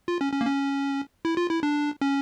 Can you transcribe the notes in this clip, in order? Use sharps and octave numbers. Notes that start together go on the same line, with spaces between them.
F4
C#4
C#4
A#3
C#4
E4
F4
E4
D4
C#4